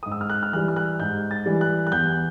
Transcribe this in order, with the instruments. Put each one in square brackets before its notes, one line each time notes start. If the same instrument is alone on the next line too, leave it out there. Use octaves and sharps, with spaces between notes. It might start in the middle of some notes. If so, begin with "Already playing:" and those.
[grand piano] G#2 D#6
E6
F6
F#6
F6
E3 G3 F#6
F6
F#6
G#2 G6
A6
E3 G3
F#6
F#6
E2 G6